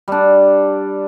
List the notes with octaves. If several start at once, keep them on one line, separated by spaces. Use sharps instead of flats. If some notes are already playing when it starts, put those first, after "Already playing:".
G3 D4